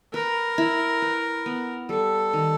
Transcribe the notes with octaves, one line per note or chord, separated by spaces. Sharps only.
A#4 B4
E4
B4
B3
G3 A4
D#3